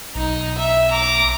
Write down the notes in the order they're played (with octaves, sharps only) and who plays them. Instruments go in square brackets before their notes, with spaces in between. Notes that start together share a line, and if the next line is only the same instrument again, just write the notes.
[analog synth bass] B1 [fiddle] D#4
[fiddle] E5
A#5 D6